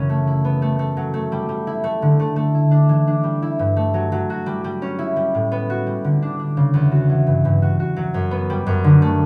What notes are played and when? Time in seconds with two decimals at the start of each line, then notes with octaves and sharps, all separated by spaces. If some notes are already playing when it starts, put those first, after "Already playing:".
Already playing: F#2 C#3 E3 C#4
0.09 A3
0.27 E4
0.45 B3
0.62 A3
0.79 A3
0.97 F#3
1.14 A3
1.32 G3
1.49 G3
1.67 E4
1.84 A3
2.02 D3
2.19 A3
2.36 A3
2.54 E4
2.71 D4
2.89 E3
3.07 D4
3.24 G3
3.42 E4
3.59 G2
3.76 A3
3.94 F#3
4.12 F#3
4.30 F#4
4.46 G3
4.64 G3
4.82 C#4
4.99 E4
5.16 G3
5.35 A2
5.52 B3
5.70 F#4
5.87 G3
6.04 D3
6.22 D4
6.39 D4
6.57 C#3
6.74 E2
6.91 F#4
7.09 E3
7.27 G2
7.45 G2
7.62 F#4
7.80 F#4
7.96 F#3
8.14 F#2
8.31 B3
8.50 G3
8.67 F#2
8.84 D3
9.02 A3